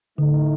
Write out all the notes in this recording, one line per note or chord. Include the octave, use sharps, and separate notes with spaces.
A2 D3 A3 D#4